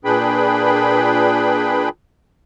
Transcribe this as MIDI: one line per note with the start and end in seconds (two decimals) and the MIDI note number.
0.05 1.89 46
0.05 1.89 62
0.05 1.89 68
0.05 1.89 71
0.05 1.89 79
0.05 1.89 83